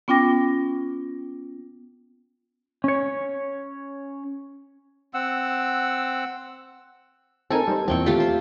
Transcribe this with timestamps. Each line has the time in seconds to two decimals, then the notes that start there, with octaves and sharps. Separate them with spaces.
0.08 B3 C#4 F4 G5 D6 A#6
2.84 C#4 C#5
5.14 C4 F#5 E6
7.51 C4 D#4 A4 A#4 G#5
7.68 G3 D#4 C5
7.88 E2 A#2 F3 C4 G5 C#6
8.06 A3 F4 G4
8.20 C5